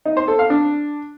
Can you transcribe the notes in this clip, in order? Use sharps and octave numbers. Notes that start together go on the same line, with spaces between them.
D#4
C5
A4
F5
D4